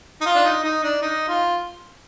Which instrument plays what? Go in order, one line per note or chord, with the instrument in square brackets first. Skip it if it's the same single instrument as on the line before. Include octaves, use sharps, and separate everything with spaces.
[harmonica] D#4
F4
D4
D#4
D#4
D4
D#4
F4